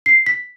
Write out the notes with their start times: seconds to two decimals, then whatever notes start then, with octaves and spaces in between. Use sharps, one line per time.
0.06 C7
0.26 B6